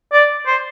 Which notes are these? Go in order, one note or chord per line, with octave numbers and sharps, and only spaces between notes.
D5
C5